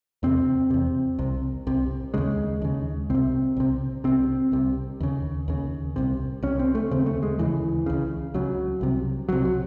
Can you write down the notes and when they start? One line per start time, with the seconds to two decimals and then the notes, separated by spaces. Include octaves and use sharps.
0.23 E2 C3 C4
0.70 E2 C3
1.19 C2 C3
1.67 C2 C3
2.14 D#2 C#3 G#3
2.61 D#2 C#3
3.10 C2 C3 C4
3.56 C2 C3
4.04 C2 C3 C4
4.52 C2 C3
5.00 D#2 C#3
5.48 D#2 C#3
5.96 C2 C3
6.43 C2 C3 C#4
6.59 C4
6.75 A3
6.91 D#2 C#3 C4
7.06 A3
7.23 G#3
7.39 D#2 C#3 E3
7.86 C#2 C#3
8.34 C#2 C#3 F#3
8.81 C2 C3
9.29 C2 C3 F#3
9.45 F#3